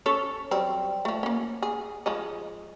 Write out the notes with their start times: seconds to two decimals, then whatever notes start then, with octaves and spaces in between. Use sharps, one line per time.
0.06 C#4 A4 C#5
0.51 F#3 G3 C4
1.05 F3 A3
1.23 A#3 C#4
1.62 G#4
2.06 F3 G#3 D#5